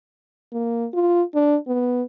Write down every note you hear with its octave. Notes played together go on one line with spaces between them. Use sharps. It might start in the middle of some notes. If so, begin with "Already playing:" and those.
A#3
F4
D4
B3